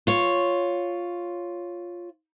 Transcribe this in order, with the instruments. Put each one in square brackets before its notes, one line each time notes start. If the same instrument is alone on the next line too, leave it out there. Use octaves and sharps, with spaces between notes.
[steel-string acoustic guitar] F4 C#5